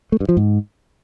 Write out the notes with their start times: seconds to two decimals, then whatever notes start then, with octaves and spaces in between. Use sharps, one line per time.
0.12 A3
0.20 G2
0.29 F3
0.37 G#2